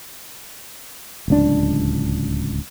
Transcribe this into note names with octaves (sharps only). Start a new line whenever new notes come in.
D1 C#2 D4